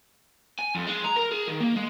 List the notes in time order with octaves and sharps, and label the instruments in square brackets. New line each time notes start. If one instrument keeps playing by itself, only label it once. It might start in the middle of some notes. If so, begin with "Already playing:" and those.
[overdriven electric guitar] G#5
F2
G#3
A#5
A#4
G#4
D#3
A#3
G#3